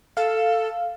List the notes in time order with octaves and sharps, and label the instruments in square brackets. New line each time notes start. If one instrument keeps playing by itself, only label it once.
[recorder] A4 [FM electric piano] F5